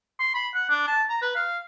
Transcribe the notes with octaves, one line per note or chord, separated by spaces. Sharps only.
C6
B5
F#5
D4
A5
A#5
B4
F5